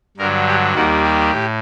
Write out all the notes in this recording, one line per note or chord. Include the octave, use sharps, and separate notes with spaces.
G2 D3 F#3 A#4
G4
D#2 D#3 G3 A#3 F#4
G4
A2